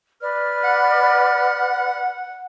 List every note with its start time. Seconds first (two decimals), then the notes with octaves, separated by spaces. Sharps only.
0.20 B4 D5 F6
0.64 F#5